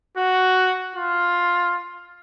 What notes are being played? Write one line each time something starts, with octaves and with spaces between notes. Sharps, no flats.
F#4
F4